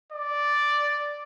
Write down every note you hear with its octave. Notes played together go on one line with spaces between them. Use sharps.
D5